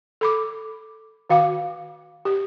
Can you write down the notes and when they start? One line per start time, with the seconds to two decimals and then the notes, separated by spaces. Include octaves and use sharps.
0.21 A4 B5 D6
1.30 D#3 F#4 F5 G5 D6
2.25 G4